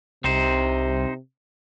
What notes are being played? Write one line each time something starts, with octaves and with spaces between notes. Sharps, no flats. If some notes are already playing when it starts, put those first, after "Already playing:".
C2 C3 C4 D#4 C5